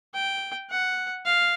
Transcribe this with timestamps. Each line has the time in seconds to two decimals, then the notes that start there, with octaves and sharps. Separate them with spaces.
0.15 G5
0.70 F#5
1.25 F5